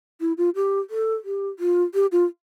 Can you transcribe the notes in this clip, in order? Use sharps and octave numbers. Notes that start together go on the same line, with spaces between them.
E4
F4
G4
A4
G4
F4
G4
F4